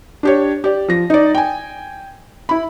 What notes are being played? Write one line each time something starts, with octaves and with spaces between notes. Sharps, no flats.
D4 G4 C#5
G4 D5
F3 A#6
D#4 D5
G5 G#5
E4 B5